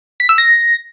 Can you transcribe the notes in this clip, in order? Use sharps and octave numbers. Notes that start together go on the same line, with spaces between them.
B6
E6
A#6